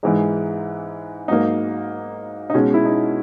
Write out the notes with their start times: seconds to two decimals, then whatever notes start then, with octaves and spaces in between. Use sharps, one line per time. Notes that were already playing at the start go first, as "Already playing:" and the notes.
0.03 G#2 E3 G#3 D#4
1.28 G#2 F#3 A#3 D#4
2.50 D#4
2.54 B2 G#3 C#4
2.74 E4
2.85 D#4